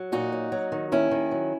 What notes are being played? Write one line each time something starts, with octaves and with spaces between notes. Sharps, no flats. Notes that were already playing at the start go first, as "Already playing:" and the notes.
Already playing: F#3
A#2 D#4 F#4
F#3
F#3
D#3
D#2 C#4 E4
D#3
F#3